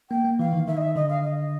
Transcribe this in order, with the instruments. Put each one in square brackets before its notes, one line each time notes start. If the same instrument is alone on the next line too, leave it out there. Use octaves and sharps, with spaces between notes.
[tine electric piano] A#3 [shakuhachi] G5
[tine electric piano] A#3
[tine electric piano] E3 [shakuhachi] F5
[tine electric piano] D#3
[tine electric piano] D#3 [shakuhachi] E5
[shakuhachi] D#5
E5
[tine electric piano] D3 [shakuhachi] D#5
[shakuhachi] F5
D#5